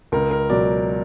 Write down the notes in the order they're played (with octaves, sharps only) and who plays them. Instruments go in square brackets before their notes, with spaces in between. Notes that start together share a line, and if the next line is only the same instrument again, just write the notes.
[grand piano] C#2 A#4
A#4
B2 F#3 D5